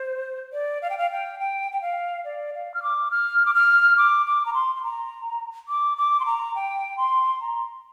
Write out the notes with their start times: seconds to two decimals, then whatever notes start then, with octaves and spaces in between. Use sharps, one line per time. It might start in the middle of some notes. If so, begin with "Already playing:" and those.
Already playing: C5
0.53 D5
0.82 F5
0.90 G5
0.98 F5
1.11 G5
1.40 G5
1.72 G5
1.82 F5
2.25 D5
2.54 F5
2.74 F6
2.83 D6
3.11 F6
3.46 D6
3.54 F6
3.97 D6
4.26 D6
4.46 A#5
4.54 C6
4.75 C6
4.83 A#5
5.68 D6
5.98 D6
6.20 C6
6.26 A#5
6.55 G5
6.98 C6
7.41 A#5